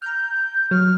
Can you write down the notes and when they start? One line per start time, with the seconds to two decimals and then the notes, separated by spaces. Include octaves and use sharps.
0.02 A#5 F6 G6
0.71 F#3 F6